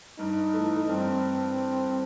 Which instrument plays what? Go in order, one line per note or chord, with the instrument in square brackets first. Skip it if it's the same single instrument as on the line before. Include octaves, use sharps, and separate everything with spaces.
[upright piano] G2 [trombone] D#4
[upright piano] E3 A3
[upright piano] G2 [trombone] C4